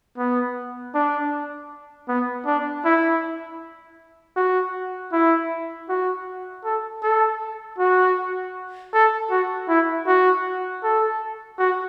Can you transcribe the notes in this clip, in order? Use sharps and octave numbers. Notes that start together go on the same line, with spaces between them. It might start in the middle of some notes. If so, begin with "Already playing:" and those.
B3
D4
B3
D4
E4
F#4
E4
F#4
A4
A4
F#4
A4
F#4
E4
F#4
A4
F#4